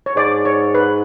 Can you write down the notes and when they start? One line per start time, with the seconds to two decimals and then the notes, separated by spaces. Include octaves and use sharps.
0.06 C#5
0.16 G#2 D5
0.45 C#5
0.75 B4